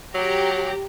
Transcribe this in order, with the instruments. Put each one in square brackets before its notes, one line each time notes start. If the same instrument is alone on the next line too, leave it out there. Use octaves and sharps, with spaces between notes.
[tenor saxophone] F#3 [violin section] G4 A#5